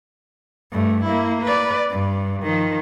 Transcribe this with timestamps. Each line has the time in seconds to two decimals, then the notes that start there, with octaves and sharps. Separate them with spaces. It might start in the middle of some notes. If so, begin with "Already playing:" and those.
0.71 G2 A3
1.05 A#3 E4
1.42 B4 D5
1.91 G2
2.42 D#3 F3